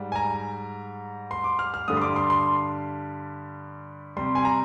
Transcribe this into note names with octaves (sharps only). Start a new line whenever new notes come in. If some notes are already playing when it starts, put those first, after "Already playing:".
Already playing: G#2 G3
G#5
A#5
C6
D6
F6
F6
G2 D3 G3 D#6
C6
D6
C6
C6
C3 G3 C6
G#5
A#5